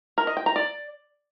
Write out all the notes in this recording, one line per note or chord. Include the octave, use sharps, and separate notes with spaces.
A#4
D#5
G5
A#5
D5